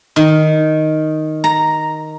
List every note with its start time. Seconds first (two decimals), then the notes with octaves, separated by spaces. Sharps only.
0.16 D#3
1.44 A#5